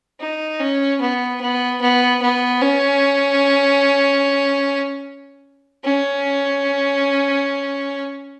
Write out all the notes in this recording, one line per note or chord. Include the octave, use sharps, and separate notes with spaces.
D#4
C#4
B3
B3
B3
B3
C#4
C#4